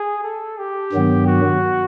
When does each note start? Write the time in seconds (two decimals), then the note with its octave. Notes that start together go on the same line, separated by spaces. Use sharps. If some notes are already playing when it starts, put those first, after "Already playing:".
Already playing: G#4
0.23 A4
0.58 G4
0.93 G2 D#3 F#3 B3
1.27 F#4